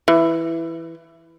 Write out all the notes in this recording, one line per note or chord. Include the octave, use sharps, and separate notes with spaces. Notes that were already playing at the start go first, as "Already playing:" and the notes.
E3